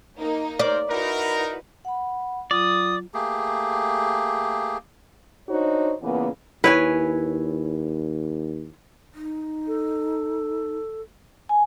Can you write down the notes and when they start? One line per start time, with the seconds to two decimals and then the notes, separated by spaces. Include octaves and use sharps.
0.18 A#3 D#4
0.59 A#4 C5 D5
0.89 D#4 E4 F#4 A#4 B4
1.85 F#5 B5
2.51 F#3 F4 D5 D#6
3.14 A3 A#3 G4 G#4
5.49 D4 D#4 F#4 C5 C#5
6.02 A#2 C#3 E3 A#3 B3
6.64 D#2 E4 B4 C#5 G#5
9.14 D#4
9.67 A4
11.49 G#5